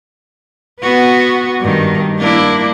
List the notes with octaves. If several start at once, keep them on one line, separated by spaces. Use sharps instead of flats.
B3 F#4 B4
G2 D#3
A#3 D4 E4